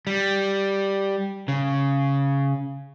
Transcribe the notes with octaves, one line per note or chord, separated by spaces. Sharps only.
G3
C#3